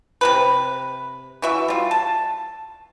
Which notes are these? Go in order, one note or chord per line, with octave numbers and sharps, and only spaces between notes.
C3 G#3 B4
E3 F#4 E5
G3 F4
A5